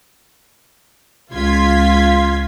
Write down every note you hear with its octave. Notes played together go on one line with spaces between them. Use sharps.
C#2 F4 C6 G#6 B6